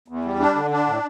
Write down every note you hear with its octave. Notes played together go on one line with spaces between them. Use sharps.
E2
G3
D4
D3
D4
A2